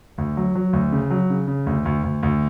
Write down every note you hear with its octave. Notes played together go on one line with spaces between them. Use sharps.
D2
F#3
F#3
D2
C#3
F#3
C#3
C#3
D2
D2
D2
D2